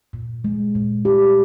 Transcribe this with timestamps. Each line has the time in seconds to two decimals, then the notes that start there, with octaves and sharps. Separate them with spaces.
0.13 A#2
0.44 G#3
0.75 A#2
1.05 G4